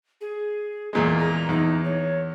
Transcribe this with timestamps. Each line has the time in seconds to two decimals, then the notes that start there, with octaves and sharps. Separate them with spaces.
0.21 G#4
0.93 E2 A#2 G#3 G#4
1.18 A#5
1.49 E2 D#4
1.84 C#5